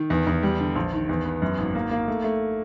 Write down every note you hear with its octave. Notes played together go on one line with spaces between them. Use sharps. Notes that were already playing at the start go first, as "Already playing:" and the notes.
Already playing: D#3
E2
E2
G3
D3
A#1
D#3
E2
B3
F#2
G#1
A#3
A#3
A3
A3